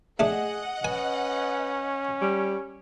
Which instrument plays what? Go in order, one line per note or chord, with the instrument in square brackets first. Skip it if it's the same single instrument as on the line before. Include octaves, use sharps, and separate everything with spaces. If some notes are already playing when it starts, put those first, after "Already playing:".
[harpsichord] A3 D4 [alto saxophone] G#4 [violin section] D#5 F#5
[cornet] C#4 [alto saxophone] B4 [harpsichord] G#5
[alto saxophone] G3